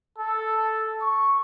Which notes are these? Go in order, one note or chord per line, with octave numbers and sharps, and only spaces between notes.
A4
C#6